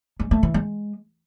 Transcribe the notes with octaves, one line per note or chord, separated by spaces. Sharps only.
G#3
A3
E3
G#3